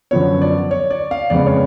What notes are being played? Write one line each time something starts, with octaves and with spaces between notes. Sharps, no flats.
F#2 D3 F3 B3 C#5
D5
C#5
D5
F5
F2 C#3 G#3 B3 D5
C#5